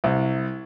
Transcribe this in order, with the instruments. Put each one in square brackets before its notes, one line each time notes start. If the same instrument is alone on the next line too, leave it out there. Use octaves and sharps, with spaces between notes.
[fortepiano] C2